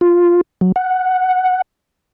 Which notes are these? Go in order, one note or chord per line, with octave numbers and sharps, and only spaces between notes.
F4
F#3
F#5